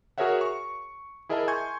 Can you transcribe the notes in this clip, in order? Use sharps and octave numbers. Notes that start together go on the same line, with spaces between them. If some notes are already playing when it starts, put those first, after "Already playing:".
F#4 G#4 A#4 C#5 E5 F#5
C#6
E4 G#4 A#4 D#5 E5 A5
G#5 C6 C#6 G6 G#6